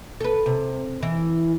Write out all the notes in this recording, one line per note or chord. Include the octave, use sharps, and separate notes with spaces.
A4 B4
C3
E3